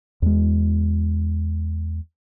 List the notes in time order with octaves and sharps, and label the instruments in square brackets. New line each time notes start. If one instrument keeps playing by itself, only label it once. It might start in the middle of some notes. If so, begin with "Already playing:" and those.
[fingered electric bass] E2 G#3